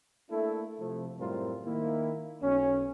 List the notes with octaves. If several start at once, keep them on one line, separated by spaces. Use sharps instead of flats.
A3 A#3 D4 E4 A4
C3 F3 A3
F#2 A2 G3 C4 F4 A#4
D#3 A#3 E4
B1 C#4